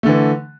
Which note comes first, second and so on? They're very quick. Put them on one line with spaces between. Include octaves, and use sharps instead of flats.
A3 D3 E3